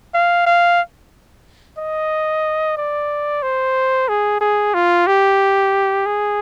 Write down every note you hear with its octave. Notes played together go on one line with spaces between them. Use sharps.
F5
F5
D#5
D5
C5
G#4
G#4
F4
G4
G#4